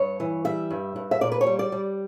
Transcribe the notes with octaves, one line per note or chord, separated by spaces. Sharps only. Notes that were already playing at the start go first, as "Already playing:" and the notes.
Already playing: G2 C#5
E3
G3 E5
G2
G2
E5
A#2 D5
B4
C#5
G3
D5
G3